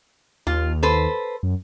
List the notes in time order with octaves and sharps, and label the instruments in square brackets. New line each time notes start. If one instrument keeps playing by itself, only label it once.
[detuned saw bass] D#2 [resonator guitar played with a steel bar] F4
[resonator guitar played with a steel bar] A4 B4 C5
[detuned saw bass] F#2